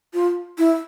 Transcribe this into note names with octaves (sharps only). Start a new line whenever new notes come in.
F4
E4